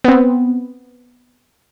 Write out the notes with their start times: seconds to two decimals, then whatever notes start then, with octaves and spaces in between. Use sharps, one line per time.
0.04 B3 C4